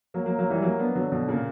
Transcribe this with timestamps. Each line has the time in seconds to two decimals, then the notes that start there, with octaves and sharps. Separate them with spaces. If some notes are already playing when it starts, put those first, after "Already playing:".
0.14 F#3 A#3
0.26 F#3 A#3
0.39 F#3 A#3
0.50 E3 G3
0.62 F#3 A#3
0.80 B3 D4
0.95 D3 F#3
1.12 B2 D3
1.29 A#2 C#3